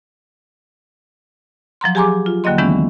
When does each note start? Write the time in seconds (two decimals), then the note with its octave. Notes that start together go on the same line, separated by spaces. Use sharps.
1.81 F3 F#3 A#5 C6
1.95 G4 G#4 G#5 A#5 C6 D6
2.26 F4
2.44 D#2 D3 F#3 A#3 D#5 C6
2.58 D#3 E3 G#3 B3 C#4 E4